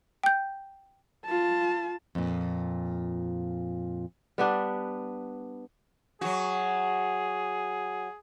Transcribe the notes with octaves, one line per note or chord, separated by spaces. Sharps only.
G5 G6
F4 A5
F2 A#2
G3 B3 D4
F#3 F#4 G#4